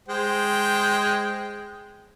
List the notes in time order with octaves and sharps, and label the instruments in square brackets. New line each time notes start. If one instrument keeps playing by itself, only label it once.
[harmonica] G#3 C5 G5